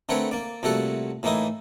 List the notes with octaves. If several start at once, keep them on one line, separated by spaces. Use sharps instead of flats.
D3 A3 C4 A#4 B4 C#5
A#3 D5
C2 A#2 A3 F#4 A4 F#5
A2 E3 A#3 D#4 E4 D#6